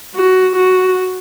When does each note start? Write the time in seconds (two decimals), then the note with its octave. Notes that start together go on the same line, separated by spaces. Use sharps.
0.15 F#4
0.56 F#4